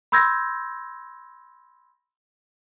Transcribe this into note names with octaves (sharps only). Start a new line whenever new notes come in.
B5 C6 E6 G6 G#6 A#6